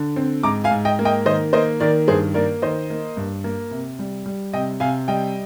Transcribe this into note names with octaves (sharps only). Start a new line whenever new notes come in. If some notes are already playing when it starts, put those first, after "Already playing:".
Already playing: D3
C4
G#2 A#5 D6
F5 G#5
G#2
D#5 G5
A#3
D#5 G5
D#3 C5 D#5
A#3 C5 D#5
D#3 A#4 D5
G2 G#4 C5
A#3 A#4 D5
D#3 C5 D#5
A#3
G2
A#3
C3
G3
G3
C3 D#5 G5
C3 F5 G#5
G3 D#5 G5